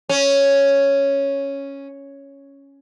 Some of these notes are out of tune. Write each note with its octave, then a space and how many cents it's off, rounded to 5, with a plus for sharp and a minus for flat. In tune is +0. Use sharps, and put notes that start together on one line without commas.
C#4 +0